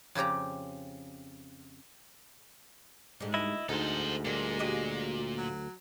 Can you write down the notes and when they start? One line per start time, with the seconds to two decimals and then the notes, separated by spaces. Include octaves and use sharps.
0.15 F2 C#3 G4 D5 A#5
3.20 G#2 D3 G3 G#3
3.34 D2 E4 D#5
3.69 D2 G#2 D#4 A4 C5
4.25 A#2 G3 G#3 A#3
4.59 F#4 G4 D#5
5.38 F#3